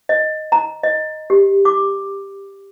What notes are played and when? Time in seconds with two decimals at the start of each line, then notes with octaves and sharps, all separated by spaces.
0.09 D#5
0.52 A#5
0.83 D#5
1.30 G4
1.65 D6